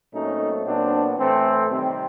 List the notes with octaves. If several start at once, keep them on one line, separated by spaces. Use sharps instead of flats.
A#2 F#3 A3 C4 C#4 D#4
A#2 F#3 B3 C4 D4
A2 E3 A3 C4
C3 D#3 G3 C4